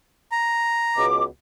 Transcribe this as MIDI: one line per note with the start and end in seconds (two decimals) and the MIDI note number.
0.32 1.05 82
0.96 1.23 37
0.96 1.23 47
0.96 1.23 86